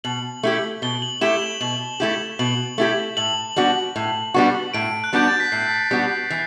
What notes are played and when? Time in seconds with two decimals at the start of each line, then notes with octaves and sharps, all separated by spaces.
0.04 B2 F#7
0.43 A3 E4 G4
0.82 B2 G7
1.02 F#7
1.21 A3 E4 G4 E7
1.42 F#7
1.61 B2 F#7
2.00 A3 E4 G4
2.39 B2 F#7
2.78 A3 E4 G4
3.17 A2 F#7
3.56 G3 B3 D4 F#4
3.96 A2
4.34 G3 B3 D4 F#4
4.74 A2 D7
5.04 F#6
5.13 G3 B3 D4 F#4 G6
5.28 A6
5.40 B6
5.52 A2 C7
5.91 G3 B3 D4 F#4
6.30 E3 C7